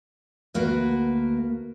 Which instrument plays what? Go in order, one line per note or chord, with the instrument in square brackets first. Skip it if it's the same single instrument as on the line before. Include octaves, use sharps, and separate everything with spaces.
[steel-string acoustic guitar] D2 A#3 F#4 A#4 B4